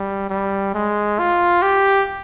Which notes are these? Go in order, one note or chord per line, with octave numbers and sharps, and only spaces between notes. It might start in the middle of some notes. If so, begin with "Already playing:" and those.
Already playing: G3
G3
G#3
F4
G4